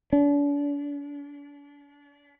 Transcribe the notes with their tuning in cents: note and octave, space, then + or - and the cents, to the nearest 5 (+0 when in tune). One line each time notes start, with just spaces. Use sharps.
D4 -40